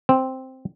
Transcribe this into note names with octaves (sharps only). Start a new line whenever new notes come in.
C4